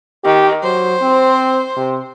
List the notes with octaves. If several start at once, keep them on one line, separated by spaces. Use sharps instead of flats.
D#3 G4
F#3 C5
C4
C3